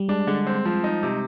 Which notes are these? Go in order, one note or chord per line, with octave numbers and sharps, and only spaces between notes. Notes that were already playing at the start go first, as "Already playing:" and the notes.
Already playing: G3
G#3 D4
D3 G#3
C4
F3
D#4
C3